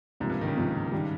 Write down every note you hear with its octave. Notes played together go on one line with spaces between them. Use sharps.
C#2 G#2 C3 F3 A#3
G2
D#3
C#3
C#2 C3 F3 A#3
D#3 G3